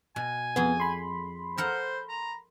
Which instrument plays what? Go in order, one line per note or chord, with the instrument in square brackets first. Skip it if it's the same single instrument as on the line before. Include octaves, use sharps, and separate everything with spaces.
[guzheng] B2 [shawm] G#5
[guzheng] F2 G#4 [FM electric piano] B3
[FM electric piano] B5 C6
[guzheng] A4 A#4 F#5 [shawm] C5
[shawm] A#5